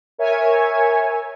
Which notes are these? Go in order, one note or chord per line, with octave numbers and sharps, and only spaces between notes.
A#4 C#5 E5 G#5